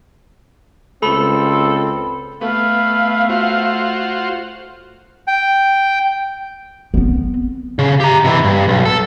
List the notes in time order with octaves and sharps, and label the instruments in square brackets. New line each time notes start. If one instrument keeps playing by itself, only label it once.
[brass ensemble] C#2 C4 [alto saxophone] A4 [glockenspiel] B5
[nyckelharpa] A3 [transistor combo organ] B3 [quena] F5
[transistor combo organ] F4 F#4 C5
[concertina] G5
[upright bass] B3 C4
[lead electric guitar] C#3
G4 A#5
C3 E3
G2
B1
A4